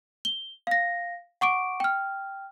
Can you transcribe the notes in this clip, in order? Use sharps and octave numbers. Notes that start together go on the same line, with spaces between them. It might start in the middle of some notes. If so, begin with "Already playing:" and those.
G7
F5 A#6
F#5 C#6 D6 D7
G5 F6